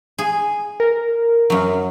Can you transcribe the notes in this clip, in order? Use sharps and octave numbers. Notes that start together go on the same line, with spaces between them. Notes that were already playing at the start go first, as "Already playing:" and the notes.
G#4
A#4
F#2 F#3